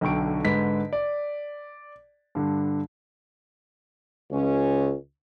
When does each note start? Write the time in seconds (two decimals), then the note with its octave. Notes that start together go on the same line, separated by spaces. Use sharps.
0.01 B1 D3 G5 C#6 D7
0.45 G#2 D3 B4 B6
0.93 D5
2.35 G2 D3
4.31 C#2 C#4